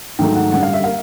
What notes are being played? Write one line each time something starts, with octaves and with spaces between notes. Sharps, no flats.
G#2 D#3 F#3 A3 G5
F#5
F#2 D3 G3 F#5
F5
E5
A#3 F5